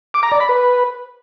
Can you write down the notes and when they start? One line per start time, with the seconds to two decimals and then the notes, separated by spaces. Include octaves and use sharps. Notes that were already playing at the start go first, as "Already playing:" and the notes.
0.14 D6
0.23 A#5
0.32 D5
0.40 B5
0.49 B4